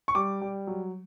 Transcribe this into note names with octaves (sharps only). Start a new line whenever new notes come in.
C#6
G3 D6
G3
F#3